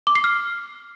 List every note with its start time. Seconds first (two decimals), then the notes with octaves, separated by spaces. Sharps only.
0.07 D6
0.15 C7
0.24 F6